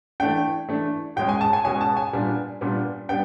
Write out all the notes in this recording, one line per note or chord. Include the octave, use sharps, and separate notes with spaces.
E3 A3 D4 G5
E3 A3 D4
B2 G#3 C#4 G5
G#5
A5
G#5
B2 G#3 C#4 G#5
A5
G#5
A#2 G3 B3 D4
A#2 G3 B3 D4
G3 B3 D4 G5